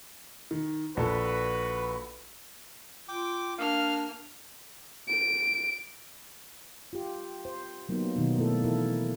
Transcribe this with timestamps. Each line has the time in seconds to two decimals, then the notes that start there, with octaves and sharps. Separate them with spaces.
0.51 D#3
0.97 A#1 F#4 A4 B4
3.09 F4 G5 D6
3.58 A#3 D4 F5 F6
5.08 D7
6.93 F4 G4
7.45 C5
7.89 F#3 A#3 B3 D#4
8.16 B2 D#3 F#3 B3 D#4
8.37 A3 A#3 E4 A4
8.64 E3 E4 A4 A#4